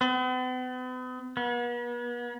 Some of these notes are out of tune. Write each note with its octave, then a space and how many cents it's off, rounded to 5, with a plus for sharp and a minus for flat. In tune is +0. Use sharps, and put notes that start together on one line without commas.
B3 +45
B3 -40